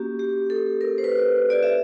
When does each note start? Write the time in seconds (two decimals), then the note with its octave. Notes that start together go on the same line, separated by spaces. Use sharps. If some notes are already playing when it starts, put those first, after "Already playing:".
Already playing: A#3 C#4 F#4 G4
0.19 G4
0.50 A4
0.81 A#4
0.98 C5
1.04 B4
1.50 D5
1.63 E5